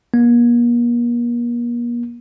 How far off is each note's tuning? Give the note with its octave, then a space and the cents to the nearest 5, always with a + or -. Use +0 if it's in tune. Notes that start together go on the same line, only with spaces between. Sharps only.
A#3 +40